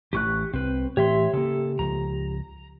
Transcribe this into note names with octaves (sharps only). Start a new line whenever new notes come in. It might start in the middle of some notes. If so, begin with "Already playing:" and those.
A1 A2 E3 G4 C#6 F#6
C2 C4 B4
A2 E3 G4 C#5 E5 C6
C#3 A#3 A4
C#2 F3 A#5